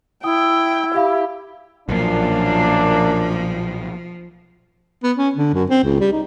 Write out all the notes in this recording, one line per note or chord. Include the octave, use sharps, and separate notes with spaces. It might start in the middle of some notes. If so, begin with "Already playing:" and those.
E4 G5 D#6
G4 E5 F5 B5
B1 F#2 A#2 F3 A#3 D4
B3
C#4
D3
F#2
C4
C#2
G3
D#4